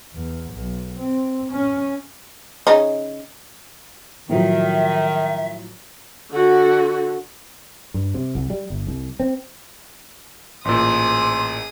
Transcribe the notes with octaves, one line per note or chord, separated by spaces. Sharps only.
E2
B1
C4
C#4
C#3 C#4 D#4
A2 D#3 F3 F#3 E5
D3 F#4
G2
C3
C2
G3
G1
C2
C4
A1 A#2 G#4 C5 D#6